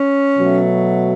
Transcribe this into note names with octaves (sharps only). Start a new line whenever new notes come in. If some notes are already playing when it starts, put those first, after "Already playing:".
Already playing: C#4
B2 F#3 A3